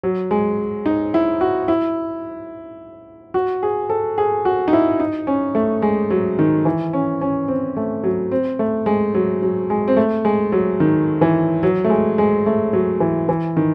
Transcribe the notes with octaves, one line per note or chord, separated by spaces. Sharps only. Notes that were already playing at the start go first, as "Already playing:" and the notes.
F#3
G#3
D#4
E4
F#4
E4
F#4
G#4
A4
G#4
F#4
D#4
E4
D#4
C#4
A3
G#3
F#3
D#3
E3
C#4
C#4
C4
A3
F#3
C4
A3
G#3
F#3
F#3
G#3
C4
A3
G#3
F#3
D#3
E3
F#3
A3
G#3
G#3
A3
F#3
E3
E3
D#3